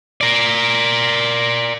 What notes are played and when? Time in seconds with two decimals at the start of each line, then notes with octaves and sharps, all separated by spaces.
0.21 A#4 D5